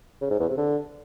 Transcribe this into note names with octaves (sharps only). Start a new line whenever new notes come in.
C#3
G#2
E2
C3
D3